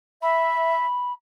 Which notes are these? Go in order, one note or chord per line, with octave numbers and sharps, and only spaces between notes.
E5 B5